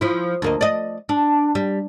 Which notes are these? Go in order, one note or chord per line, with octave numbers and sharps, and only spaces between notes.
F3 E4
D2 A#3 D#5
D5 D#5
D4
G3